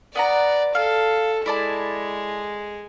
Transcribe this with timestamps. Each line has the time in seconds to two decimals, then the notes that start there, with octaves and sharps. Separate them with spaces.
0.15 B3 D5 F#5 A#5
0.75 A4 F5
1.46 G#3 E4 D5 A5